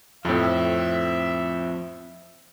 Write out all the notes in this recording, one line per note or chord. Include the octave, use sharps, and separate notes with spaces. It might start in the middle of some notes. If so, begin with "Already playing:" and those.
F2 A2 F3 C4 E5